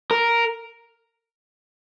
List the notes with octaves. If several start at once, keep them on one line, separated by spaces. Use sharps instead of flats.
A#4